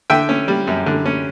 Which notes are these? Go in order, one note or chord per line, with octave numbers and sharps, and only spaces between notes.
D3 E5 G5
C#4
G3
F#2
D3
C#4